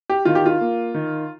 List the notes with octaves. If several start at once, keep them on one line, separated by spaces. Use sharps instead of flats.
G4
D#3 F4
G4
F4
A#3
D#3